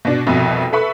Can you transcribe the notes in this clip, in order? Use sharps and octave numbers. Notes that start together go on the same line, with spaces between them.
B2 D4
C2 F2 B2
A4 B4 E5 B5 C#6